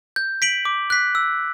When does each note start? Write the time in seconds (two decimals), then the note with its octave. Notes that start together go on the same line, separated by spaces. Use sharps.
0.16 G6
0.42 B6 D7 F#7
0.65 D6
0.90 F#6 B6
1.15 E6